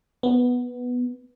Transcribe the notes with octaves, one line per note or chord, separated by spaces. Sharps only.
B3